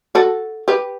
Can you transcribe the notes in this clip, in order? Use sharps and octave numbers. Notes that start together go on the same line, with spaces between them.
F#4 A4
G4 B4